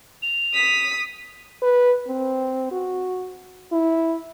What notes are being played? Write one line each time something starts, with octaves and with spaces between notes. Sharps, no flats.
F7
D#6 B6
B4
C4
F#4
E4